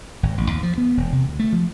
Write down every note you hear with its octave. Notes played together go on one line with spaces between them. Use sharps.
G#1
A1
D#2
F3
B3
E1
C3
D2
A3
F3